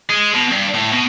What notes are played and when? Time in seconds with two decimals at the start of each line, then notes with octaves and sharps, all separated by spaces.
0.10 G#3
0.35 B2
0.51 G2
0.74 A2
0.92 B2